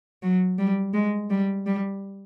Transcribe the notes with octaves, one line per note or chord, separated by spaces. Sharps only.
F#3
G3
G#3
G3
G3